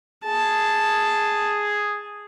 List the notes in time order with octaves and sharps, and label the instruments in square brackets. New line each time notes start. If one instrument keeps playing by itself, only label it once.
[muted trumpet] G#4 [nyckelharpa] A5